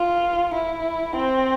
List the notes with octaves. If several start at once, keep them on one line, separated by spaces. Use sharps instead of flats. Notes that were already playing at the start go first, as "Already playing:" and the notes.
Already playing: F4
E4
C4